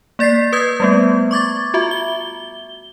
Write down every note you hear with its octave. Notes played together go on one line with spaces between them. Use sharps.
A#3 D5 A6 B6 C7
B4 D#6 G6 G#6
G3 A3 B3
C#6 D6 G#6 A6
F4 F#4 E5
G7